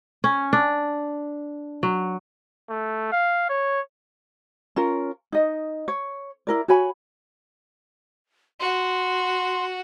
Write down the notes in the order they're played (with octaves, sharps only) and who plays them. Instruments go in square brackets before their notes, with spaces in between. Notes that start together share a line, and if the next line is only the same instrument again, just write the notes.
[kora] C#4
D4
F#3
[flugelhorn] A3
F5
C#5
[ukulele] C#4 F4 A#4
D#4 D#5
C#5
E4 A#4 D5
F#4 C#5 G#5 B5
[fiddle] F#4 [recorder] C6